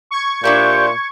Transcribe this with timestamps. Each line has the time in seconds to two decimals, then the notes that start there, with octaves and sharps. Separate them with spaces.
0.11 C#6 G#6
0.44 A#2 D4 E4 G4 C5